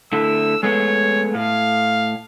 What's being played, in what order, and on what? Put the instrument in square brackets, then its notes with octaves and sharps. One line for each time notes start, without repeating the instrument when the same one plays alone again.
[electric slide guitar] D3 A3 E4 [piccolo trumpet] E6
[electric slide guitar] G#3 A3 B3 [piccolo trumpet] C#5
[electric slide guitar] A2 [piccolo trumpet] F5